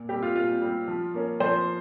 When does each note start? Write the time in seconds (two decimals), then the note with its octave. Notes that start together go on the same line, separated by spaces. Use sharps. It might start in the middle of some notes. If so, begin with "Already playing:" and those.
Already playing: A#2
0.09 G3 C4 G4
0.22 F4
0.35 A#2 F4
0.61 G3 C4
0.88 F3
1.14 A#3 C#4
1.40 F3 C5